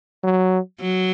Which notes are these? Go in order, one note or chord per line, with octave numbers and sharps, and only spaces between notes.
F#3
F#3